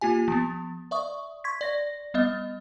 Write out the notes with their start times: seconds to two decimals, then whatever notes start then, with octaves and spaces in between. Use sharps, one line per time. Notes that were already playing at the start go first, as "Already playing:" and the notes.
0.01 A#3 F4 G4 G#5
0.28 F3 B3
0.91 D5 E5 C#6 D#6
1.44 C6 C#6 G#6 B6
1.61 D5 A#6
2.14 G3 B3 D#5